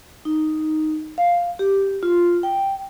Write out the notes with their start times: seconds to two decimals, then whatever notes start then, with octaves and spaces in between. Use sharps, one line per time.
0.25 D#4
1.18 F5
1.59 G4
2.03 F4
2.43 G5